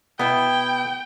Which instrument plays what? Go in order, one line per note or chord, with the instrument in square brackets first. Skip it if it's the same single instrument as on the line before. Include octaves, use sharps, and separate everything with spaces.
[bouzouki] B2 E4 [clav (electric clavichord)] B3 [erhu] G5